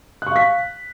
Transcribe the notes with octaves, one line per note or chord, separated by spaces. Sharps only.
F5 C#6 F#6 B6